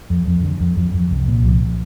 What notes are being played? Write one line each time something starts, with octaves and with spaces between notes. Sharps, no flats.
F2
F2
D3
F2
F2 F3
F2
C2
A#2
C2 F3